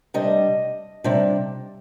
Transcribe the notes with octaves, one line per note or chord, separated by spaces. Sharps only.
C3 G3 D4 D#5
C3 G3 D4